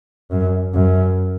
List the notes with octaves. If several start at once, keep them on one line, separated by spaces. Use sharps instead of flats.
F#2
F#2